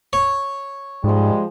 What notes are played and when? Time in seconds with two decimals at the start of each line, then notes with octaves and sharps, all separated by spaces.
0.13 C#5
1.04 G#2 F3 G3 G#3